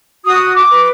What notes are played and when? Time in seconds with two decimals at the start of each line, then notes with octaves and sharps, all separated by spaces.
0.24 F#4 D#6
0.55 D6
0.70 B4